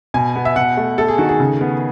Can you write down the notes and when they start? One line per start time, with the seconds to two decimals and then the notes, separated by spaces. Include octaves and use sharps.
0.14 B2 G#5
0.36 B3
0.45 E5
0.56 B2 F#5
0.77 A3
0.98 A3 A4
1.08 G#4
1.18 D#3 F#4
1.29 G#4
1.40 C#3
1.61 B3